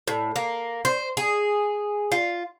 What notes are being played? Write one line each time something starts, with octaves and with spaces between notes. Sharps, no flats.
A2
A#3
C5
G#4
F4